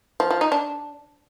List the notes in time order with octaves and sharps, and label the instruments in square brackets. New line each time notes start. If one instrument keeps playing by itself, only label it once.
[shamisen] F3
F3
D#4
D4